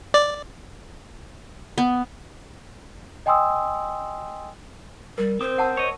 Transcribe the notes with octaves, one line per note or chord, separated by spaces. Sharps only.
D5
B3
D#5 G5 G#5 C6 D#6 E6
G3 A#4
C4 C5 D#6
F#5 A5 E6
C#5 D#5